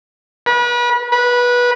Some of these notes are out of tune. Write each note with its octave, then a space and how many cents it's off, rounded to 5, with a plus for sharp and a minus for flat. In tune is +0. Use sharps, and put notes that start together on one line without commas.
B4 -35
B4 -20